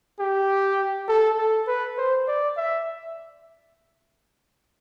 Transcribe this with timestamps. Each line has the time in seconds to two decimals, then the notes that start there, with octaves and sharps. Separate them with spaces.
0.20 G4
1.08 A4
1.39 A4
1.68 B4
1.98 C5
2.28 D5
2.57 E5